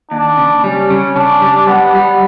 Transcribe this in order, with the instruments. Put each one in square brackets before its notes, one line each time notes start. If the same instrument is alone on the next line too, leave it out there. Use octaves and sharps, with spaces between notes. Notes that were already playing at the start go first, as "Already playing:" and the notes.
[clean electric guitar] D#2 [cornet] D4
[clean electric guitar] C#3
[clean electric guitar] G3 [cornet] C#4
[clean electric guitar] C#3
[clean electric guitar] C#3 [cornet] D4
[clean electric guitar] G3
[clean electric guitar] G3 [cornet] B3
[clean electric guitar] G3